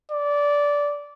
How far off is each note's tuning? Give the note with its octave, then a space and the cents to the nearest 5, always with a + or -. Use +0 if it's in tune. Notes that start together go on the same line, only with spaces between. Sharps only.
D5 -15